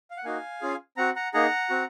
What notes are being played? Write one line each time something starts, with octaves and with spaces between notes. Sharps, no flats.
F5
F#5
A#3 D#4 F#4 F5 G#5
C#4 F4 G#4
C4 F#4 F#5 A#5
F#5 A#5
A#3 D#4 G#4 F#5 A#5
C4 F#4